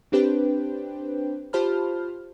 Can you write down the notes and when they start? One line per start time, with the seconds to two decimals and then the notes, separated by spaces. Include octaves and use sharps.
0.12 C4 D4 G4 B4 C5 G5
1.53 F4 G4 C5 A5 B5 F6